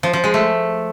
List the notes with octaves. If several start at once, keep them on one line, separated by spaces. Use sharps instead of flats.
F3
F3
G#3
A3